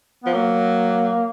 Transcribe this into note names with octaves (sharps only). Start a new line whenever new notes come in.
F3 B3
F#3 A#3